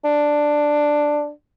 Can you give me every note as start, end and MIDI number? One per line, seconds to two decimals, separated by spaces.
0.04 1.30 62